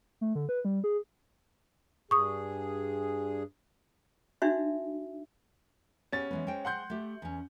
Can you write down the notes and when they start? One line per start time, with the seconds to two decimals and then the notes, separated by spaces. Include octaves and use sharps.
0.21 A3
0.35 D3
0.49 B4
0.65 G3
0.84 G#4
2.11 G2 G#4 C#6 D#6
4.42 D4 D#4 F#4 E5
6.12 B3 C#4 G4 G#4 A6
6.31 E3 G#3 B3
6.47 G#3 C5 G5
6.65 F#5 C6 G6
6.90 A3 G4
7.22 E2 C#4